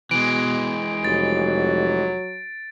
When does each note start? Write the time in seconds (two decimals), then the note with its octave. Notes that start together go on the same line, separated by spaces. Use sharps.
0.11 B2 E3 G#3 D7
1.05 F1 F#3 A6